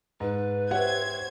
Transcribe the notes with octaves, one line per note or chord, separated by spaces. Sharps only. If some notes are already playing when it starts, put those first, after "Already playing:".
G#2 B4
G4 C5 C#5 E5 F#5 G#6